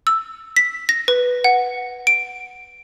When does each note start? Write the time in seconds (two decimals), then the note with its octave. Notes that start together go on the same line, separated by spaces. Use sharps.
0.07 E6
0.56 B6
0.89 A#6
1.08 B4
1.44 F#5
2.07 D7